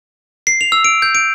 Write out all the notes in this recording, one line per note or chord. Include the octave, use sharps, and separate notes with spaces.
C7
F7
E6
D7
G6
D7